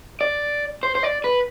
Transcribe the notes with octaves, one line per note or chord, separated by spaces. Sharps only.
D5
C5
C5
D5
B4